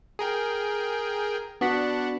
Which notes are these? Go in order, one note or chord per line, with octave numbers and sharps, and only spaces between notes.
G#4 A#4 G5
B3 D4 F#4 F#5 B6